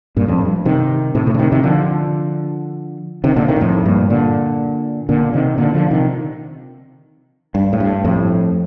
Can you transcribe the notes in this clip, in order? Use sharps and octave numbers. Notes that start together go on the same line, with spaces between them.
G2 A#2
F2 A2
G2
C3 D#3
A2 C3
A2 C3
D3
C3 D#3
C3 D#3
D3 F3
C3 D#3
A#2 D3
C3 D#3
A#2
F2 A2
G2 A#2
A#2 D3
A#2 D3
C3 D#3
A#2 D3
D3 F3
C3 D#3
G2
A2
G2
F2 A2